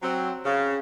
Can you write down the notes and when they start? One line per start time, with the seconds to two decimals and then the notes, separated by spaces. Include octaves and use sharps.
0.03 F#3 C4
0.45 C#3